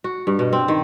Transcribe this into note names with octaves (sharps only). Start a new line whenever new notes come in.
F#4
G2
B2
C4
D#3